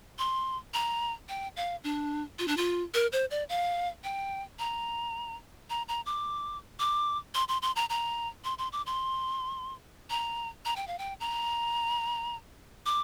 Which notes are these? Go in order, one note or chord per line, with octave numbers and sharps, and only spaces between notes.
C6
A#5
G5
F5
D4
F4
D4
F4
A#4
C5
D5
F5
G5
A#5
A#5
A#5
D6
D6
C6
C6
C6
A#5
A#5
C6
C6
D6
C6
A#5
A#5
G5
F5
G5
A#5
D6